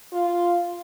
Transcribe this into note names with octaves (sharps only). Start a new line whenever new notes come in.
F4